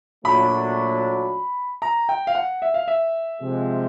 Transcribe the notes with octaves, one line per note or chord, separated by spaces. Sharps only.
A#2 F#3 A3 D4 B5
A#5
G5
F5
F#5
E5
F5
E5
C3 F3 G#3